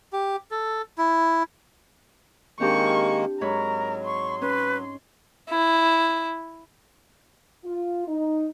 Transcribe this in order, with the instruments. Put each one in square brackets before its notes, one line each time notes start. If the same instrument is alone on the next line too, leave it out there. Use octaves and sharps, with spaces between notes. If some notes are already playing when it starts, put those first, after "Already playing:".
[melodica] G4
A4
E4
[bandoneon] D#3 G#3 A#3 [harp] C4 D4 G4 [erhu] C#6
[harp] G#2 C#5 B5 [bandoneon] F#3 [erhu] A#4
[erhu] C6 [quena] C#6
[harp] C#4 [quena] B4
[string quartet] E4
[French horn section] F4
D#4